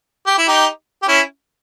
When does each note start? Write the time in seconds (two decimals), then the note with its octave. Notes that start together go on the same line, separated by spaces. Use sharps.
0.26 G4
0.38 E4
0.48 D#4 G4
1.02 G4
1.08 C#4 E4